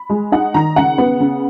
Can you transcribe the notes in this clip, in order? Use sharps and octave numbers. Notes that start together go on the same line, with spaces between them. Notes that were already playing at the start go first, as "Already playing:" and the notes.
Already playing: B5
G#3
D#4 F#5
D#3 A#5
C#3 F#5
B3
C#3